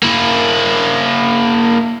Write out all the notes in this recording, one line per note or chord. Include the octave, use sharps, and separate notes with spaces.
A#3 E4